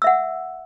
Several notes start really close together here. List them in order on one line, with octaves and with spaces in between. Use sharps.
E6 E5 F#5